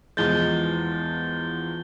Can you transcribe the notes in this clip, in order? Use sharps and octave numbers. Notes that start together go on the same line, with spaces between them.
E2 F3 G#3 G6 A6 G7